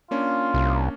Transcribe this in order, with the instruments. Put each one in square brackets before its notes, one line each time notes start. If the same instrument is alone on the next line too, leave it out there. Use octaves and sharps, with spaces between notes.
[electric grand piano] A#3 C#4 D4 [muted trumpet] F4
[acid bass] C2